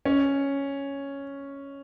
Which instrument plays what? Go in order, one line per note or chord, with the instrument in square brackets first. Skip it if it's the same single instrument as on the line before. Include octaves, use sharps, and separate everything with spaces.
[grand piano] C#4